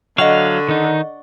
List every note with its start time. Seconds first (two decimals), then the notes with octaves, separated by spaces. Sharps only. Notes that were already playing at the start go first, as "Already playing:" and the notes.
0.18 D3 F#3 D#5 F5 F#5 C#6
0.69 D#3 D#4